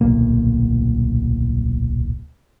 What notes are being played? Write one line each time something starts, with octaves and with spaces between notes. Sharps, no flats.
D1 B1 A#2 A#3